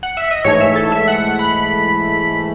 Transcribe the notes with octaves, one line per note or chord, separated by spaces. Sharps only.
F#5
E5
D#5
G#2 E3 A3 C#5
E5
A4
E5
F#5
B5